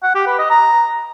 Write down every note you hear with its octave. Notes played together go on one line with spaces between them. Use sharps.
F#5
G4
B4
D#5
A#5